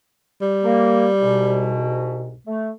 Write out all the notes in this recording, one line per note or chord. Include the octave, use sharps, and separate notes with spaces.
G3
A#3
C2 G#2 B2
A3